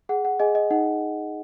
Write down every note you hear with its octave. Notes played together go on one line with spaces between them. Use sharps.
G#4 F#5
F#5
G#4 D#5 G#5
D#5
D#4 F#5